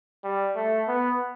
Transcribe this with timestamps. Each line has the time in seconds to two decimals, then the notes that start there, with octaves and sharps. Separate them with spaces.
0.24 G3
0.56 A3
0.88 B3